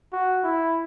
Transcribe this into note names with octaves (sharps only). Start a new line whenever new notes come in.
F#4
E4